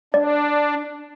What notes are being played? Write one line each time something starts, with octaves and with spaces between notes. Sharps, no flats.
D4 D5